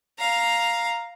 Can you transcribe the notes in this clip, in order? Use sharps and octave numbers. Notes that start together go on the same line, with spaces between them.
F5 A#5